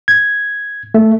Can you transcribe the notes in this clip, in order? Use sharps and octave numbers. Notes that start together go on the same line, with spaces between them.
G#6
A3